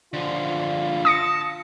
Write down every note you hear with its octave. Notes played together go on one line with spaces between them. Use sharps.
D3 F3 F4
A5 D#6 A#6 C#7